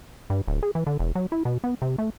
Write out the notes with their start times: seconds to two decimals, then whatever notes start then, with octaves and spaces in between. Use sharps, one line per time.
0.30 G2
0.48 D1
0.63 G#4
0.75 E3
0.87 D3
0.99 E1
1.15 F#3
1.32 E4
1.45 B2
1.64 B3
1.82 C3
1.98 A3